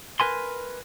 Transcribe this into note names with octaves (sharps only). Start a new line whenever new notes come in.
A#4 B4 G#5 C6